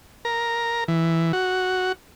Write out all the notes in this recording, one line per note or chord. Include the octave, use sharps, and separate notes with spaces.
A#4
E3
F#4